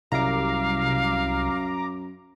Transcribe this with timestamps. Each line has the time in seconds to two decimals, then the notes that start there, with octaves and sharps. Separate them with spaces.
0.12 C2 F#2 F5 A#5 D6